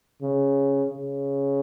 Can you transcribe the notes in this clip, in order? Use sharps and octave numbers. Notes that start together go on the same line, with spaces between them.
C#3
C#3